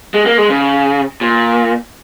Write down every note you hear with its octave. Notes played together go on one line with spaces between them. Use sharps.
G#3
A#3
G#3
C#3
A#2